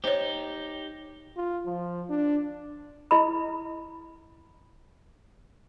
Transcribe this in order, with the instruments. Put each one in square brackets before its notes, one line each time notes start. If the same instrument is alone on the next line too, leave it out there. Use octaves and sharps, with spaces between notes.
[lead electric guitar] D#4 G4 [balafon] C5 C#5
[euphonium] F4
F3
D4
[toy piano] E4 D#5 B5